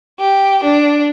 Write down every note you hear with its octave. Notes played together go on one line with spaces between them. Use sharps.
G4
D4